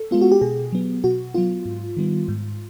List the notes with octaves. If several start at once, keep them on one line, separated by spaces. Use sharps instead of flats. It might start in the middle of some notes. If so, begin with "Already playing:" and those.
Already playing: A4
G#3 B3 F4
F#4
G4
B2 G#4
F#3 B3
B2 F#4
F#3 B3 F4
G#2
D#3 G3 B3
G#2